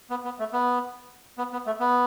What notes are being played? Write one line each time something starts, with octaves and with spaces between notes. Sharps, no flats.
B3
B3
A3
B3
B3
B3
A3
B3